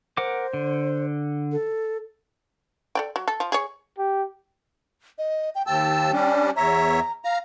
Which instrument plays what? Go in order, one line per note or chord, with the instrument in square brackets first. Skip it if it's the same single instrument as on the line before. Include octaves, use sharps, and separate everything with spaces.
[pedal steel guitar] A#4 F#5 D6 [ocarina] C5
[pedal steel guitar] D3
[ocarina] A4
[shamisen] A4 D5 G5
F#3
A4
F3
G#4 C#5
[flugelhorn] G4
[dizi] D#5
G5
[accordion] D#2 A5 E6 [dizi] G5
[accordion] G3 C#4 D4
[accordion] E2 C#5 E5 [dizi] A#5
[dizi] F5 [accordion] A#5